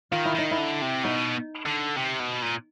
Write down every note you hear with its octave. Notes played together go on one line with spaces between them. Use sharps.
D#3 F4
E4
D#3 D#4
E4
D3
C3
B2 D#4
D3
C3
B2
A#2